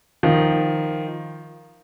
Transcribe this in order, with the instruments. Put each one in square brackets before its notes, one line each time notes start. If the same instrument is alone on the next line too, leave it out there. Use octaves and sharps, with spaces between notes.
[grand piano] D#3 F3